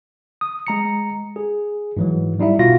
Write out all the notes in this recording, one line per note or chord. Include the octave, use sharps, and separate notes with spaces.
D#6
G#3 A#5 C#7
G#4
G#2 E3 F#3
G3 D#4 E4 E5
B2 F4 F#4 F5 A#6